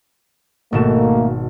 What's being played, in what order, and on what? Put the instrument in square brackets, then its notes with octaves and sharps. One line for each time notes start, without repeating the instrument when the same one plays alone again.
[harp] G#1 B2 E7 [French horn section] A3 A#3